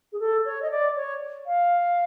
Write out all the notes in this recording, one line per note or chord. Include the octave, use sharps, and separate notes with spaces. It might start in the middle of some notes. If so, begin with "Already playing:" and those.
G#4
A4
C#5
D#5
D5
C#5
F5